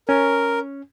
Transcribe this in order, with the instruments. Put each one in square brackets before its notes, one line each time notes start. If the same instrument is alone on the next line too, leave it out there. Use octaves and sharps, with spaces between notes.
[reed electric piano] C#4 [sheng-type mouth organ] A#4